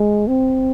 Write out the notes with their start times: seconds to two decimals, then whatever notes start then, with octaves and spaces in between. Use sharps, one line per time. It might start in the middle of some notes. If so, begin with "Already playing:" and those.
Already playing: G#3
0.27 C4